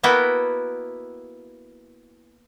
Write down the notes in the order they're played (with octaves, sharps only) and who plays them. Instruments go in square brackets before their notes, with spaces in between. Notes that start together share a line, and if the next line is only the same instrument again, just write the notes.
[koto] A#3 B3 E4 F#4 G5